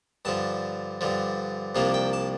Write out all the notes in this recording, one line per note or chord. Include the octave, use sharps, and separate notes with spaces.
G2 D3 F3 A5
G2 D3 F3
C2 C3 F3 A#3 D4 F5
G5
A5